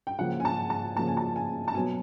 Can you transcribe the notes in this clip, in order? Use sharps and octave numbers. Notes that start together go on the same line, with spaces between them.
G5
C#3 F3 A#3 F#5
G#5
A5
A5
C#3 F3 A#3 A5
G#5
A5
G#5
A5
B2 F#3 B3 G#5